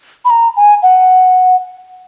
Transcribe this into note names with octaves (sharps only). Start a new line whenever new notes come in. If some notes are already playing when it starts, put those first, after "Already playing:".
B5
A#5
G#5
F#5